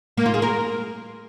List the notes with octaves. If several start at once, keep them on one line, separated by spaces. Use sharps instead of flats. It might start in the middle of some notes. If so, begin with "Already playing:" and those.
A#3
F4
G#4
A#4